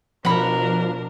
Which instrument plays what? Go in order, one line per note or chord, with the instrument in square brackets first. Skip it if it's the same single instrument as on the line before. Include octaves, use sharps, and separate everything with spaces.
[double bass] B2 [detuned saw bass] F3 [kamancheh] D4 A#4 [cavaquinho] F#5 B5